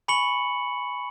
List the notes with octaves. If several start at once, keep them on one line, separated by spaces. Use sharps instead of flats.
G#5 B5 C#6 C#7 F#7